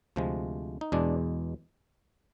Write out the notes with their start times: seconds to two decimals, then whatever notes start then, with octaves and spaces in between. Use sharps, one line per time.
0.16 D2 C3 F3 G#3
0.81 D#4
0.92 E2 B2 G#3 D4